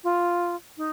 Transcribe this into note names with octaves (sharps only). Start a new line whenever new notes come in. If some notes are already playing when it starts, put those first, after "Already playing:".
F4
D#4